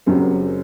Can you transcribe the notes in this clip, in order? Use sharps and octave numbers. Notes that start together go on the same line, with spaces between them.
F#1 F#2 F#3 C4 G4